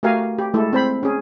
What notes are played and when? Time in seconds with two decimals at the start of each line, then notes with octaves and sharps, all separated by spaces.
0.03 A3 F#4 G4 A#4 F5 G#5
0.38 G4
0.54 G#3 A3 E4 A4
0.73 C4 C5 B5
1.03 C#4 G#4